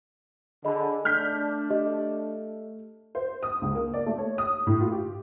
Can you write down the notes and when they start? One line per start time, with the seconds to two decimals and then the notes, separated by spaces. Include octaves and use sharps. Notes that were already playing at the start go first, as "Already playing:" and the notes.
0.65 D3 G#4 D#5 B5
1.05 A3 D4 F6 G6 B6
1.70 G4 D#5
3.15 C5
3.43 D#6
3.62 C#2
3.75 A#3
3.93 D5
4.06 A3
4.18 C#5
4.38 D#6
4.67 A2
4.81 F4
4.92 G4